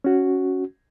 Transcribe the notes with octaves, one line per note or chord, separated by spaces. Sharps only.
C#4 F#4